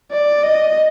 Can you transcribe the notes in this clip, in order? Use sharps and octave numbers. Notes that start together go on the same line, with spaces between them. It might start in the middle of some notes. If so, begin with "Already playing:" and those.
D5
D#5